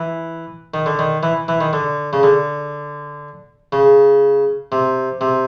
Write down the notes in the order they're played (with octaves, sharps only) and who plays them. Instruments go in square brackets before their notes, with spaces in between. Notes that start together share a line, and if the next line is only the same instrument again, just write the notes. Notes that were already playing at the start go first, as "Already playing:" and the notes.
Already playing: [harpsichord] E3
D#3
D3
D#3
E3
E3
D#3
D3
C#3
D3
C#3
C3
C3